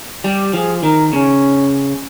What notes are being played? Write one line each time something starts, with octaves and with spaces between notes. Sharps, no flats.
G3 G4
F3 G#4
D#3 A#4
C#3 C#4